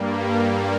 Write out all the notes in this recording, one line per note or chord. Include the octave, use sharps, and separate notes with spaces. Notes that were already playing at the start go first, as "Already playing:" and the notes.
Already playing: G2 G3 A#3